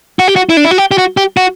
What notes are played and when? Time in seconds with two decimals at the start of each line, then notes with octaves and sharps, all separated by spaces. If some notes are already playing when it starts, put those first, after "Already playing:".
0.19 F#4
0.28 G4
0.36 F#4
0.49 E4
0.57 D4
0.64 E4
0.71 F#4
0.78 G4
0.91 G4
0.98 F#4
1.17 G4
1.37 F#4